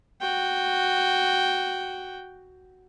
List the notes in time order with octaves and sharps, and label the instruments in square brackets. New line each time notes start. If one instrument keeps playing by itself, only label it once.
[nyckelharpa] F#4 G5